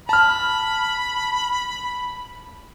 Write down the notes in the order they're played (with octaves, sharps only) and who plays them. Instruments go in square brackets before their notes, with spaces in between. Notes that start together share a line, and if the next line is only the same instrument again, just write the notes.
[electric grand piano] A5 F6 [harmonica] B5